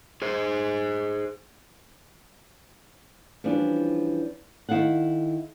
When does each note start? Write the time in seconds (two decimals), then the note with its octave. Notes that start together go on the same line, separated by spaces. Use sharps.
0.22 G#4 C5
3.44 E3 F3 G3 C#4 D4
4.69 D#3 E4 A4 F5 F#5